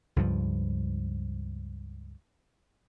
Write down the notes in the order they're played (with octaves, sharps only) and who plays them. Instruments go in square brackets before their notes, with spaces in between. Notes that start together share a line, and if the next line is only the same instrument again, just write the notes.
[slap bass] C#2 G2 F3